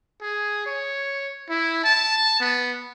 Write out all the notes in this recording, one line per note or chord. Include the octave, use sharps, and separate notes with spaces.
G#4
C#5
E4
A5
B3